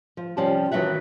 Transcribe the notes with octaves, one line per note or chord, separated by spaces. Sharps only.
F3
C3 F3 G3 C#4 G4 A5
D#3 E3 F#3 B4 E5 F#5